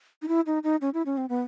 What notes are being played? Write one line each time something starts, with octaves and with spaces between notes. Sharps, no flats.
D#4
E4
D#4
D#4
C#4
E4
C#4
C4
B3